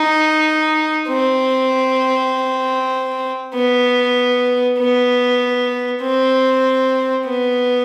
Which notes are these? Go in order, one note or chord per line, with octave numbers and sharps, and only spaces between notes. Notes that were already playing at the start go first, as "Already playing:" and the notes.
Already playing: D#4
C4
B3
B3
C4
B3